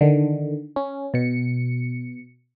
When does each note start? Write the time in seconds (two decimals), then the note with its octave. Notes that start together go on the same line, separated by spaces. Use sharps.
0.01 D3 D#3
0.76 C#4
1.14 B2 C#7